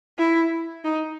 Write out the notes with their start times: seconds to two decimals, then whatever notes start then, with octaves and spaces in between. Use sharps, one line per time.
0.18 E4
0.84 D#4